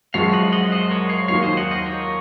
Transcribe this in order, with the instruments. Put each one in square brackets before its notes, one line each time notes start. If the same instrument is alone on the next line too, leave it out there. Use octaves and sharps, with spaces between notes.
[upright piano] F#2 F3 G#3 [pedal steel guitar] C#5 F5
[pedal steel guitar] D#5 F#5
D#5 F#5
C5 D#5
A#4 C#5
C#5 F5
[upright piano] D#2 D#3 F#3 A#3 F4 [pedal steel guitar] C#5 F5
[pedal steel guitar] C5 D#5
D#5 F#5
C5 D#5
A#4 C#5